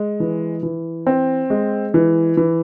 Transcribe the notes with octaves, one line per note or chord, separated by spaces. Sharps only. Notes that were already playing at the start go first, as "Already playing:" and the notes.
Already playing: G#3
E3
E3
C4
G#3
E3
E3